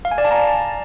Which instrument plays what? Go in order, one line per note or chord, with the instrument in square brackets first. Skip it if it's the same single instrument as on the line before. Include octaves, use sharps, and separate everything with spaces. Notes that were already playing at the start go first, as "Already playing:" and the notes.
[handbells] F5
G#5
D5
A5
A#5